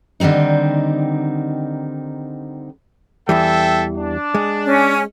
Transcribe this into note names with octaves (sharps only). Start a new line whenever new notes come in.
D3 D#3 G3 C4 D#4
E2 E3 G3 A4 E5 G5
D4
G#3
C#4